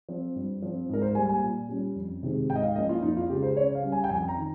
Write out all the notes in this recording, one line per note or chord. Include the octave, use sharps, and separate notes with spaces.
F3 C4
G2
F3 C4
G#2 A#4
C5
G3 A#3 G#5
G#5
A#2
G3 C#4
F2
C3 D#3 G#3 C4
G#2 G5
D#5
F5
F3 A#3 C#4 D#5
F4
F2 D#4
F4
C#3 G#3 G4
C5
C#3 C#5
F5
G3 C#4
G#5
G5
F2 G#5
A#5
D#3